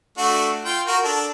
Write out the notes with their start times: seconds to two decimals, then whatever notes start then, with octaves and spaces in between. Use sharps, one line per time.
0.18 A3 D4 F#4
0.65 F4 G5
0.87 F#4 A#4
1.04 D4 A4